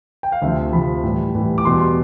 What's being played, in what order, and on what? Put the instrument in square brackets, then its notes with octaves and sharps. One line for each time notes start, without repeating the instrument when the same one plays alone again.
[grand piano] G5
F5
D2 C3 F3 E5
D2 C3 F3 B5
A2 E3 G3
A2 E3 G3
D6
E2 B2 G3 C6